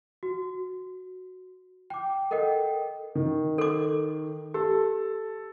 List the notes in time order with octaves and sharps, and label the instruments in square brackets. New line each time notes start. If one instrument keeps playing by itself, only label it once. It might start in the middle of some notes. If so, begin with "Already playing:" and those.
[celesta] F#4
G5 D6
A4 A#4 D#5 F#5 G5
[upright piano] D#3
[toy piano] A4 D6
[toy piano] G4 [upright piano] A4